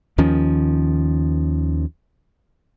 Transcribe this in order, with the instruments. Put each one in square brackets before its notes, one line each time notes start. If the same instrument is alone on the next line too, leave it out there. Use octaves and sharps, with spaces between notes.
[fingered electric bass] D#2 D#3 F3 C#4